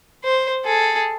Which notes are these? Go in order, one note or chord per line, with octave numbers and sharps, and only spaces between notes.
C5
G#4 A4